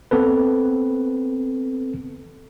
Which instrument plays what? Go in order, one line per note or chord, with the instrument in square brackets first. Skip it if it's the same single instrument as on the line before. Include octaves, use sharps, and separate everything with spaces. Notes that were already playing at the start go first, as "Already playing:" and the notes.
[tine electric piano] B3 C4 A4 B4